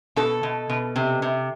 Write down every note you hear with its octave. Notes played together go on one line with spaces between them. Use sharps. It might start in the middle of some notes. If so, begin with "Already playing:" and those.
B2 A4
B2
B2
C3
C3